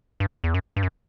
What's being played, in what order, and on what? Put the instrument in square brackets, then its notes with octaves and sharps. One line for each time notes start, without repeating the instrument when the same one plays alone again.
[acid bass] G2
E2
F#2
G2
F#2